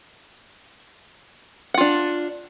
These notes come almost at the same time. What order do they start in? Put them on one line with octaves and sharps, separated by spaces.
F#5 F4 D4